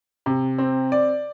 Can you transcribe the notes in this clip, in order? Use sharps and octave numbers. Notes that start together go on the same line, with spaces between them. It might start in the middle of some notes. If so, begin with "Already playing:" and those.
C3
C4
D5